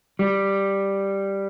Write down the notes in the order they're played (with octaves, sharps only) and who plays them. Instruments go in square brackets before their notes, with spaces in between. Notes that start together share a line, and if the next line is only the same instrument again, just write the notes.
[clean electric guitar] G3